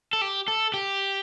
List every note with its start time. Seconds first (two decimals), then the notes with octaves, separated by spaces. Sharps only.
0.13 A4
0.22 G4
0.48 A4
0.74 G4